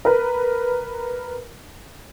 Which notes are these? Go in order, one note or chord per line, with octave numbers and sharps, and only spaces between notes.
A#4 B4